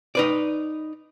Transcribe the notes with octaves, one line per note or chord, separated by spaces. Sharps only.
D#4 B4 D5